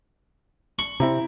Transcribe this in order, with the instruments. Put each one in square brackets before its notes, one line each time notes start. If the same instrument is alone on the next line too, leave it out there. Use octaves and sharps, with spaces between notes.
[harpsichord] C#6 [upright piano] F#7
[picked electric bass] C3 C4 [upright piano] E4 A#5